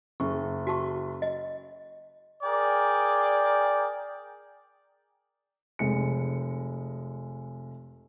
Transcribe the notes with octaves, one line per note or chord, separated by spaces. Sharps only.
F#1 C#6
F#4 A5 C#6
D#5
G#4 A#4 D5 G5
F1 G#3 C#7